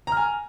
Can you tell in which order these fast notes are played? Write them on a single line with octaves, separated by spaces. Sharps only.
A#5 F6 G#5